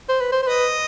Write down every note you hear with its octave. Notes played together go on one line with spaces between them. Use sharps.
C5
B4
C5
C5
B4 D#5